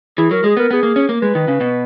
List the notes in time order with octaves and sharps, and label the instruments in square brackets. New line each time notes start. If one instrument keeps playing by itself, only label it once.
[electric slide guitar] E3 [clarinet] G#4
[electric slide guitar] F#3 [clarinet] A#4
[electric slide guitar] G#3 [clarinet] G#4
[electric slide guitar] B3 [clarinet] A#4
[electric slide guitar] B3 [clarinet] G#4
[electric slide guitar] A#3
C#4
A#3
[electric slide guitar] G#3 [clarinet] B4
[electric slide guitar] D#3
C#3
B2